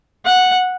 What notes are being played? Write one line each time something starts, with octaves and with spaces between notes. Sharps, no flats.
F#5